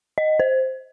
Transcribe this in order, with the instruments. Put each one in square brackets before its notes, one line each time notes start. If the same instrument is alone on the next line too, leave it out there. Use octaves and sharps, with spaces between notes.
[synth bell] D#5
C5